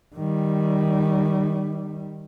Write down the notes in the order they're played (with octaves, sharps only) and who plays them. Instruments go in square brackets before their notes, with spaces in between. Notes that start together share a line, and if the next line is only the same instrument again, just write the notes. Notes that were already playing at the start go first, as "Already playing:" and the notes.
[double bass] D#3 G3